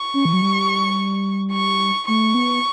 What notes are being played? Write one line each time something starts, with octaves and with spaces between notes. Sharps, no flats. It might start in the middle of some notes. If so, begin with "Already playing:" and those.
Already playing: C#6
C#4
E3
F#3
G3
C#6
A3 C#6
B3